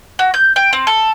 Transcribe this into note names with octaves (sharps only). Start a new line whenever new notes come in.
F#4
G6
G5
C4
A4